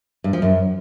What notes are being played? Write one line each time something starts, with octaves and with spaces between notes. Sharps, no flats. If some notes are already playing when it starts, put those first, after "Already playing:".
G2
F3
F#2